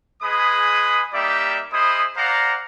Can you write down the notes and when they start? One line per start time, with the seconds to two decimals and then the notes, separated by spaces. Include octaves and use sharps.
0.22 G#3 G#4 B4 B5 D#6
1.13 G3 A#3 D#4 G4 D5 E5
1.73 G#3 E4 C5 B5 D#6
2.17 C5 D5 F5 F#5 A#5